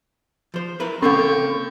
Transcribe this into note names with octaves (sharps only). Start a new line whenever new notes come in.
F3 C5
E4 A#4 B4
C#3 A#3 C4 C#4 A4 G5 C#6